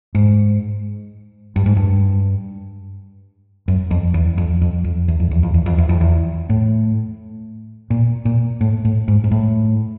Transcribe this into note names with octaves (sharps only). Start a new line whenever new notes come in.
G#2
G2
G#2
G2
F#2
F2
E2
F2
F2
F2
E2
F2
E2
F2
E2
F2
E2
F2
E2
A2
A#2
A#2
A2
A2
G#2
G#2
A2